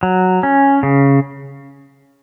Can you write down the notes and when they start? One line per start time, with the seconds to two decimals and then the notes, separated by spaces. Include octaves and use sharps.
0.03 F#3
0.43 C#4
0.83 C#3